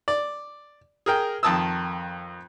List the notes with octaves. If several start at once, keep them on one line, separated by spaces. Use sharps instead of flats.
D5
G#4 A#4 G5
F2 D#3 A5 D#6 E6